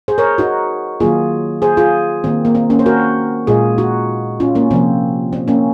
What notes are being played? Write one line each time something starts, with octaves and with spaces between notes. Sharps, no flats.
G#4 C5
A#4 C#5
D#4 F#4
D#3 F#3 A#3 F4 G#4
G#4 C5
F4 G#4
D#3 A#3 C4
A#3
C4
A#3 C#4
C5
F#4 A#4
A#2 G#3 F4 G#4
D#4 F#4
C#4 F4
A#3 C#4
C3 F3 A#3 C4
C4
A#3 C#4